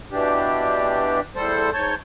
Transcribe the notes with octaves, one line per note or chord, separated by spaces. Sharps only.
B2 E3 D4 G4
E2 G3 A4 C5
G#2 C#5 A5 G6